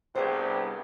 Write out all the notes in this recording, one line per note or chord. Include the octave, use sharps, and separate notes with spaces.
C2 G2 B3 G#4 C5